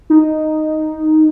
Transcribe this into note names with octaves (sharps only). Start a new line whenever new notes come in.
D#4